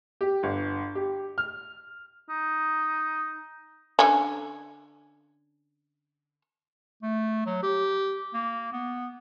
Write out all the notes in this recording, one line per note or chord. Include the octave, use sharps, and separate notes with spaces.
G4
G1
G4
F6
D#4
D3 C#4
A3
F#3
G4
A#3
B3